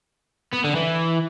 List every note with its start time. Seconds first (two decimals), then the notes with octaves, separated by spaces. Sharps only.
0.53 B3
0.65 D3
0.76 E3